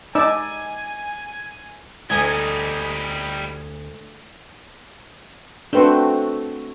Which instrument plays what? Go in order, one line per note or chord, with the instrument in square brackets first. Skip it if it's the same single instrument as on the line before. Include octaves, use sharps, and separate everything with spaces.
[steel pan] D#4 D5 E6 [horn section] G#5
[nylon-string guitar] D2 [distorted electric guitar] G3 D#4 [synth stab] G#5 D#6 G#6
[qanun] A3 C4 F#4 [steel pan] D4 B4 C6